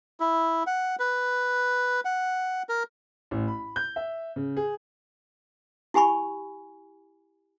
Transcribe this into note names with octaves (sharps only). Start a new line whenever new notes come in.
E4
F#5
B4
F#5
A#4
A1
B5
G6
E5
C#3
G#4
E4 G4 G#5 B5 C#6